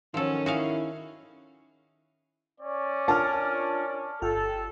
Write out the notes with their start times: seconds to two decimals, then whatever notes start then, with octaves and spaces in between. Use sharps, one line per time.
0.14 D#3 F3 F#3 C#4 A4
0.46 E4 F#4 G#4 F5
2.60 C#4 C#5 D5
3.08 D4 F4 A#4 A5 F6
4.22 G1 F4 A4 G5